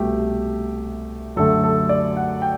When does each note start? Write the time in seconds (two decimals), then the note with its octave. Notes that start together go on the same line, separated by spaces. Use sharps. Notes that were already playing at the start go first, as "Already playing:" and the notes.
Already playing: C2 B2 A3 G4
1.36 F#2 D3 F#3 A3 A4
1.63 A4
1.89 D5
2.17 F#5
2.42 G5